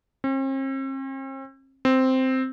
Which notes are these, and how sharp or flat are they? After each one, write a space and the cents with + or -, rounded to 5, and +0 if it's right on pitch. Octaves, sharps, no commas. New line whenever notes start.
C4 +45
C4 -5